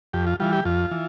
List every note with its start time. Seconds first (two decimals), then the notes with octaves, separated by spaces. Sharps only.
0.13 F2 G4
0.27 F4
0.40 E3 G3 F4
0.53 G4
0.65 F2 F4
0.91 E3